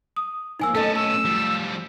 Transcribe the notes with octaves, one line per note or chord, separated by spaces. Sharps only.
D#6
G#2 F3 A#3 D#4 G#5 E6
F#3 A3 B3 C#4 A4 D#5 A5
A5 E6
F3 G3